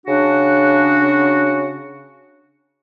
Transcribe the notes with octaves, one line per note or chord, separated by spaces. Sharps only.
C#3 D4 F#4